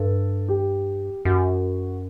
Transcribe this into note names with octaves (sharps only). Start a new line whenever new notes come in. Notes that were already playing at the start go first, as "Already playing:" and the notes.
Already playing: G2 A4
G4
F#2 F#4